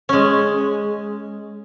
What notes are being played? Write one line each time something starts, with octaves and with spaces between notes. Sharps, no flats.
G#3 C#4